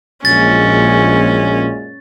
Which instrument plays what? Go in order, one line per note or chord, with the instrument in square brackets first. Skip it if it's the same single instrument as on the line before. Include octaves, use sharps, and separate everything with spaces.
[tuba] A#1 [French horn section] F#2 A#2 G#3 [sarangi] C#4 [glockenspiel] A6